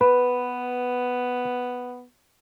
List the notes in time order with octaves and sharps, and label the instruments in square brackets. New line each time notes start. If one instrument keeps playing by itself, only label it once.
[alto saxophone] B3 [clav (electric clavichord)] B4